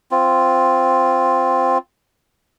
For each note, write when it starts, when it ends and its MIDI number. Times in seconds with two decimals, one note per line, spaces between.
0.11 1.78 60
0.11 1.78 65